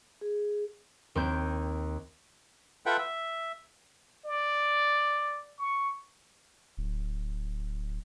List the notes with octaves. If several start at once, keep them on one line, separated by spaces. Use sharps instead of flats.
G#4
D#2 C4 G6
F4 A4 B4 E5 F#5 G5
E5
D5
C#6
D1